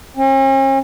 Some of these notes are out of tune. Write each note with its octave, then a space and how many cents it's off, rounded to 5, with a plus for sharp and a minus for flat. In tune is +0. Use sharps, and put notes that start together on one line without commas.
C#4 -45